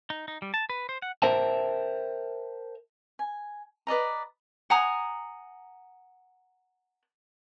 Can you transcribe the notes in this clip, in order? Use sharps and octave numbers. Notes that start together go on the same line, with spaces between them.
D#4
D#4
G3
A5
B4
C5
F#5
A#4 C5 E5 G5 A5
G#5
B4 D5 D#5 A#5
F#5 G#5 A#5 D#6